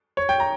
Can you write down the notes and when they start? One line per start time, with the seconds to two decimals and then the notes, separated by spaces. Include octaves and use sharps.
0.17 C#5
0.29 G5
0.40 A#5